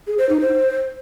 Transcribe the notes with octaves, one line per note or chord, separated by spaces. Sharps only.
G#4
C5
D#4
C5